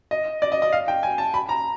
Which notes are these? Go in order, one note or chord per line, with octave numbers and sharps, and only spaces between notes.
D#5
D5
D#5
D#5
F5
G5
G#5
A5
B5
A#5